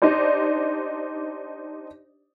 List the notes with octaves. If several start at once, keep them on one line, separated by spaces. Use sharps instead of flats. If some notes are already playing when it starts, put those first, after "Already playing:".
D4 D#4 G4 C5 D5